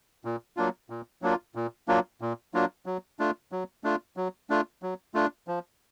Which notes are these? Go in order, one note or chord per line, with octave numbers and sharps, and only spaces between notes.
A#2
F#3 A#3 D4 F4
A#2
F#3 A#3 D4 F4
A#2
F#3 A#3 D4 F4
A#2
F#3 A#3 D4 F4
F#3
A3 D4 F4
F#3
A3 D4 F4
F#3
A3 D4 F4
F#3
A3 D4 F4
F3